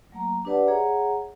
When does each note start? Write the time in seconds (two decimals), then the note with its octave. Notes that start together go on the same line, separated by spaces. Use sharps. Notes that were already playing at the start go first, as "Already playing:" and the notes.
0.12 F#3 A3 A#3 A#5
0.45 D4 G4 B4 D5 F#5 A5
0.67 G#4 C#5 E5 F#5 A#5